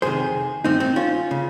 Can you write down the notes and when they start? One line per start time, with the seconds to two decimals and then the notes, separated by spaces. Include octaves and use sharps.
0.02 F2 C3 D#3 G#4 C5
0.64 G2 D#3 C4 D#4
0.80 C4 D#4
0.96 C#4 F4
1.31 C#3